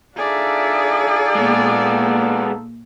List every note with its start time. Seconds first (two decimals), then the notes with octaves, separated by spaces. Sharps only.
0.16 D4 D#4 F4 G#4 A4 D5 E5
1.35 A#2 G#3 A#3 B3